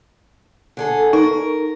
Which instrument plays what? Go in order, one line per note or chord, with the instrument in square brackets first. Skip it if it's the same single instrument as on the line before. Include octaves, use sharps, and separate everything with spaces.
[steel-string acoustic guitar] D3 G#4 A4
[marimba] D#4 [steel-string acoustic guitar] A#4